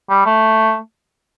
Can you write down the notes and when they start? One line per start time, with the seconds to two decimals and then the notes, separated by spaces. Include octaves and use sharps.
0.10 G3
0.26 A3